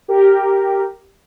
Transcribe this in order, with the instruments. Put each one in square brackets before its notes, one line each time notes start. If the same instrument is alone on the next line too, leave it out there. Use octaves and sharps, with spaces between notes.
[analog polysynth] G4 A#4